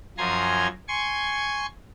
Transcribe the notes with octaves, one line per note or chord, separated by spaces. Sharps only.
F#2 F3 G#5 A#5 C6 G#6
G#5 C6 C#6 G#6